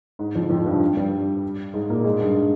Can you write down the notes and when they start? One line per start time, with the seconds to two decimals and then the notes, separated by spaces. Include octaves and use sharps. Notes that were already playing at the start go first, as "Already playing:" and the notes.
0.19 G#2
0.35 F2 F3
0.50 F2 F3
0.66 G2 G3
0.97 G2 G3
1.74 G#2 G#3
1.90 A#2 A#3
2.04 G#2 G#3
2.20 G2 G3